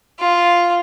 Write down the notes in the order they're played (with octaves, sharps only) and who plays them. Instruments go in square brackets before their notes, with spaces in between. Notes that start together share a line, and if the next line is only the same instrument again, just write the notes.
[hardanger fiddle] F4